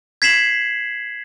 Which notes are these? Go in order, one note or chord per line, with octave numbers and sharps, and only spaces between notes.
G#6 B6 C7 E7 F#7